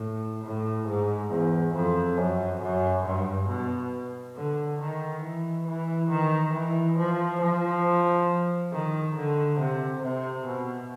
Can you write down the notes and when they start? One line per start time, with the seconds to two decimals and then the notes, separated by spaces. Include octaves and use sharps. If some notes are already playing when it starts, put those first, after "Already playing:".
Already playing: A2
0.44 A2
0.87 G#2
1.30 E2
1.75 F2
2.18 F#2
2.62 F#2
3.05 G2
3.48 B2
4.36 D3
4.80 D#3
5.23 E3
5.67 E3
6.10 D#3
6.54 E3
6.98 F3
7.42 F3
8.72 D#3
9.16 D3
9.60 C3
10.03 C3
10.46 B2